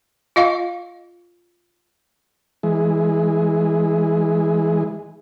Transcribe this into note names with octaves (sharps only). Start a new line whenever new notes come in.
F4 D#5 F5 C#6
E3 G#3